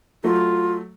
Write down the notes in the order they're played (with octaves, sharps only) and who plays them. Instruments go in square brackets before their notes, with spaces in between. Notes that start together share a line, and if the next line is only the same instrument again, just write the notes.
[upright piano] F#3 A3 [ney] F4